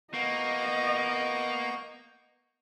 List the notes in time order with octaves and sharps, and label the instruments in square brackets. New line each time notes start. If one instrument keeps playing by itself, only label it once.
[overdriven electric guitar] A#3 [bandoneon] B3 C#6 G6 [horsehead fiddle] D#5